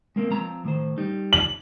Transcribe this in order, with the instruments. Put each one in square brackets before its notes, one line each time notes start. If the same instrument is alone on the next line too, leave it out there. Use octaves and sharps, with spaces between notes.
[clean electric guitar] G#3 A#3 C4
F3 C4 A#5
A2 D#3 C5
G3 D#4
[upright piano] F#7